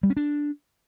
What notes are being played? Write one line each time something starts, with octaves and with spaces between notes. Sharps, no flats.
G3
C#4
D4